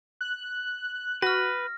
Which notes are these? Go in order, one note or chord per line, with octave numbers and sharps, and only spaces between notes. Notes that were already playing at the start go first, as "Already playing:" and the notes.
F#6
F#4 B4 F6 A#6